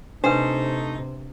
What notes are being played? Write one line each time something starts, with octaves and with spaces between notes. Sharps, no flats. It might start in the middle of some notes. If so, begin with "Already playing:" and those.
C3 A3 D4 D#4 B4 C5